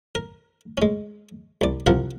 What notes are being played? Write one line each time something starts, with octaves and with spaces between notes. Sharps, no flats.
A#4
G#3 C#4
C2 D5
C2 C3 F3 A#4 F5 F#5